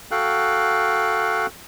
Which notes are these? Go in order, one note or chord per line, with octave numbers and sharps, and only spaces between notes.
F#4 A4 F5 G5 F#6